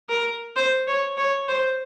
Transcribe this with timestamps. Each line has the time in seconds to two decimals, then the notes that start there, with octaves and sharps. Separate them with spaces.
0.09 A#4
0.56 C5
0.87 C#5
1.17 C#5
1.48 C5